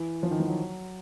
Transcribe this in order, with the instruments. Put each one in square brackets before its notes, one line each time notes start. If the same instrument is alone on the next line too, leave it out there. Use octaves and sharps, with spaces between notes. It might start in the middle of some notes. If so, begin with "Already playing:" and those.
Already playing: [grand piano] E3
F3
D#3
F3
F#3